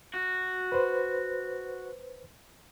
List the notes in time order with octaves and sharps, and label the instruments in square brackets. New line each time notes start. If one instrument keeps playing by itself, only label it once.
[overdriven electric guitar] F#4
[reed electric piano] B4 C5